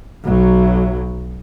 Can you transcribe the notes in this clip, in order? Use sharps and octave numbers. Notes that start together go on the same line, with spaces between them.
B1 F#3